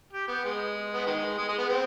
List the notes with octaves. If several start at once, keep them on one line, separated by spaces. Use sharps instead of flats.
G4
B3
G#3
B3
D#3 G#3
G#3
G#3
B3
C4